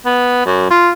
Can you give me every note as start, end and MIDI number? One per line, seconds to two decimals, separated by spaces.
0.05 0.44 59
0.46 0.68 42
0.70 0.91 65